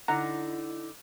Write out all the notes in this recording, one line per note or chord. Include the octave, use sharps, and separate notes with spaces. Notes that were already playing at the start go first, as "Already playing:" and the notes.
D3 D#4 E4 F#5 A#5